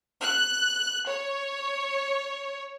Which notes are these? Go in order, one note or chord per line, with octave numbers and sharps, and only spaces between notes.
F#6
C#5